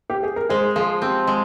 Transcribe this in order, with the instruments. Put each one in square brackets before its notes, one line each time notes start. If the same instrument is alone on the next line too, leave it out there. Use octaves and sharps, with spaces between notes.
[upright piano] G4
G#4
A#4
[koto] G#3 [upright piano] G#4 C5
[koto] F3 [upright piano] G#4
[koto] C4 [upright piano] G4
[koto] G#3